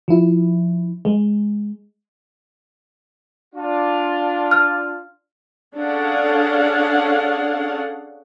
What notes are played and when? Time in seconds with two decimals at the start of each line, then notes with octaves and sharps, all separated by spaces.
0.08 F3 E4
1.05 G#3
3.55 D4 F4
4.51 F6
5.75 C#4 D4 G#4 A4 F5 F#5